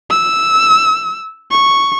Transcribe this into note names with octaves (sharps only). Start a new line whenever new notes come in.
E6
C#6